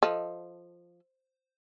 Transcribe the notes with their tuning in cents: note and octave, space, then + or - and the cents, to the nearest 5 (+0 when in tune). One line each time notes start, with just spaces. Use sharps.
F3 +0 A4 +0 D#5 +0